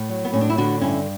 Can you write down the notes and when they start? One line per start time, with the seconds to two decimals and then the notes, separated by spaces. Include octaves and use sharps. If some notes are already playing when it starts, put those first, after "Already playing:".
Already playing: A2
0.09 F#3
0.25 B3
0.33 A2 C#4
0.41 D4
0.49 E4
0.58 D3 D4 F#4
0.81 G2 C#4 E4